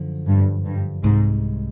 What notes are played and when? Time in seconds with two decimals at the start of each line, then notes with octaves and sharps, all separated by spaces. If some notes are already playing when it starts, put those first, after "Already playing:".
Already playing: F#2 D3 F3
0.27 G2
0.65 G2
1.03 C2 G#2 C3 F3 G#3